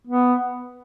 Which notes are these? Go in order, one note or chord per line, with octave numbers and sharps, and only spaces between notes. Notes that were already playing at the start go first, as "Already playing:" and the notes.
B3